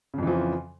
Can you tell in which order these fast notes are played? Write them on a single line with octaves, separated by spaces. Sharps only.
C#3 F2 E3 F3